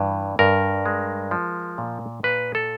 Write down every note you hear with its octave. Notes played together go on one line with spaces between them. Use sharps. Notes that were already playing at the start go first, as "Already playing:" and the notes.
Already playing: G2 E3
G2 A#4
G#3
F3
A#2
A#2 B4
A4